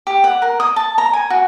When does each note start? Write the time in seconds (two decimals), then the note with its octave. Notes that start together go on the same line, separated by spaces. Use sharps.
0.07 G4
0.24 F#5
0.42 A#4
0.60 D#6
0.76 A5
0.98 A#5
1.13 G#5
1.30 F#4